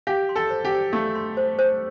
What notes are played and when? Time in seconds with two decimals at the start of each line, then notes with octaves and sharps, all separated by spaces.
0.07 G4 F5
0.29 C6
0.36 A4
0.50 C5
0.65 G4
0.72 C5
0.93 A3 F5
1.15 C6
1.37 C5
1.59 C5